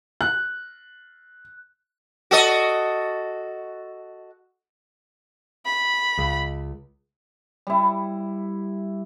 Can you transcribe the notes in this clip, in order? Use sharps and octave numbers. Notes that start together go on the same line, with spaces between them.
F#6
F#4 A4 D#5
B5
C#2
G3 E4